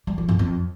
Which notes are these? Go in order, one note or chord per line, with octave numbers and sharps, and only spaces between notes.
G3
F3
G#2
F2